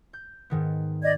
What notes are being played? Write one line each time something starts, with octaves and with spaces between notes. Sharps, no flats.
G6
G#2 D#3 B3
D5 D#5 G#6